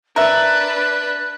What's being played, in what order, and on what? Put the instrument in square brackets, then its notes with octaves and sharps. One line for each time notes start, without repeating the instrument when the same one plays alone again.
[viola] D4 B4 [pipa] A#4 E5 [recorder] F#6